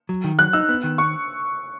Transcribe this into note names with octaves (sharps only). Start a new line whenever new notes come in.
F#3
D#3
F#3 F#6
D#4 E6
B3
D#3
C#6